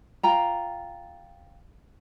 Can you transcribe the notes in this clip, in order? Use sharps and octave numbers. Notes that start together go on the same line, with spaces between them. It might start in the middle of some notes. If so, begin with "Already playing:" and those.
F4 G5 A#5